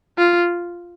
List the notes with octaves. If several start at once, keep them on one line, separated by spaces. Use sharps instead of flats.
F4